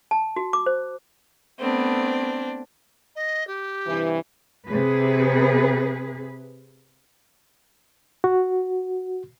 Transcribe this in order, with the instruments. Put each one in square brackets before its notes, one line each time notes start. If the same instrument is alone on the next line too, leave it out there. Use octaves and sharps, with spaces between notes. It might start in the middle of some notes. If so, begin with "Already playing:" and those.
[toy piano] A5
F#4
D6
C5
[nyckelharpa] A3 B3 [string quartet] C4 D4
[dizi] D#5
G4
[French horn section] G2 C3 E3
[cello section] C3 G#4 B4
[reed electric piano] F#4